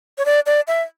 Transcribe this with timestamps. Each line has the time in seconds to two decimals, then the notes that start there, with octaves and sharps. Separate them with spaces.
0.18 C#5
0.26 D5
0.46 D5
0.68 E5